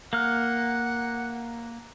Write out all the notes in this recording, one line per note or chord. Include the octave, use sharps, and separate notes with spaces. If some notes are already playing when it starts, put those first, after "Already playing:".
A#3 F#5 F6